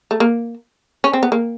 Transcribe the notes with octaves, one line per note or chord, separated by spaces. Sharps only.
A3
A#3
C#4
C4
B3
A#3